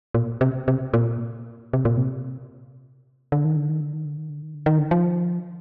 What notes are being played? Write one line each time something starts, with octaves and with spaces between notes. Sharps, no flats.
A#2
C3
C3
A#2
C3
A#2
C3
D3
D#3
D3
D#3
D3
D#3
D3
D#3
D3
D#3
D3
D#3
D3
F3